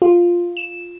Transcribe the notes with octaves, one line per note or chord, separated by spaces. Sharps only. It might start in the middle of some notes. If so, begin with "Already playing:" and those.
F4
E7